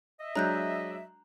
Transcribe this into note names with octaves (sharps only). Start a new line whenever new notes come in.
D#5 E5
F#3 G#3 D4 A#5 F#6 G6